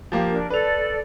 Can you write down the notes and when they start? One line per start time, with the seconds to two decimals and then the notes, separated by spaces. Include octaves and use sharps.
0.12 F3 A#3 G4
0.30 D4 A#4
0.50 A4 B4 D5 F7